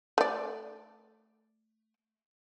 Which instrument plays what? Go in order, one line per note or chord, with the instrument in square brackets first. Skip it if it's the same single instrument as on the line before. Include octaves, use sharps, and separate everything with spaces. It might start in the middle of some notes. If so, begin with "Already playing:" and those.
[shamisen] A3 D5